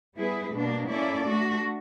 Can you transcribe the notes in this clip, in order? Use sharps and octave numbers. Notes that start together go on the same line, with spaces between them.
G3 B3 E4 G#4 B4
B2 G3 A#3 D4
A#3 C#4 E4 A4 D5
A3 D4 F#4